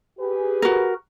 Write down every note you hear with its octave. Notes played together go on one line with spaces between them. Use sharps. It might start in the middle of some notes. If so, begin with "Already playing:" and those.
G4 G#4 B4
F#4 A#4